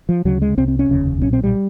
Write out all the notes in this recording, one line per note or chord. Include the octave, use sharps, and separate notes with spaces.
F3
D2 C#3 F#3
G#3
C2 C3 C4
C4
C#4
F1 D#2 C#3
B1 A#2 C#4
C4
G3